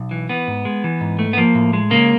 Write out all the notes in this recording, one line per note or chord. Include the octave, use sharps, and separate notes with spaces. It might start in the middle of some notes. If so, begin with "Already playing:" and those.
Already playing: B1
E3
E3 B3
G#2
G#3
E3
G#2
A3
B3
F3 A#3
A2
G#3
C#3 A#3